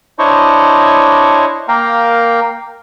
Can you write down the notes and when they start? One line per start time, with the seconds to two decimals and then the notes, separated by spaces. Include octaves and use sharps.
0.19 D4 E4 C5 C#5 D#5 C#6
1.68 A#3 A#4 F5 G5 A#5